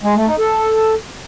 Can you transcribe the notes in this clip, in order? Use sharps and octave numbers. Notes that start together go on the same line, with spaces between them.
G#3
A3
D#4
A4